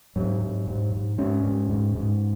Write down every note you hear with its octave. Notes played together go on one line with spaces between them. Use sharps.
G#2 F#3
G#2
G#2
G#2
G#2 C#4
G#2
G#2
G#2